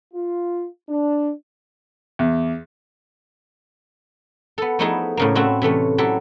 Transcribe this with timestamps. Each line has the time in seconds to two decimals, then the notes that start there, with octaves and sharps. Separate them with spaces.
0.14 F4
0.89 D4
2.19 E2
4.58 B3 A4
4.79 F3 A3 B3 D#4 E4 G#4
5.17 A2 C#3 A#3
5.35 A3 C4 E4 F#4
5.62 C3 E3 A3 C#4
5.98 F#3 E4 G4 A4